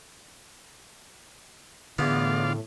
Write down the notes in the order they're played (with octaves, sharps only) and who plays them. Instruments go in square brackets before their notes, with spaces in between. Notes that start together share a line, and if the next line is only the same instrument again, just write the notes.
[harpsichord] E2 B3 [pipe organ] A2 [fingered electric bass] D3 [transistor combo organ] F4 D5 F5